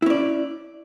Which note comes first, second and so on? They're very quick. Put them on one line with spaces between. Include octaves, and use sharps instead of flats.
E4 C#4 D5